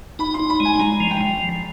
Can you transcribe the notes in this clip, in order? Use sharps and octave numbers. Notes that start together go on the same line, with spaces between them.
D#4 B5
C6
D#4
B5
G#3
G#5
G#3 A#5
F3
G5
F3